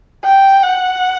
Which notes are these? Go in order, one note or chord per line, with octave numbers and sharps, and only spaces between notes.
G5
F#5